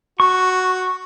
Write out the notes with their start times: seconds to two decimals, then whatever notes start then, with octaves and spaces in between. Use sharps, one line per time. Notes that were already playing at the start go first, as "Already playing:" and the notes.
0.20 F#4 C#6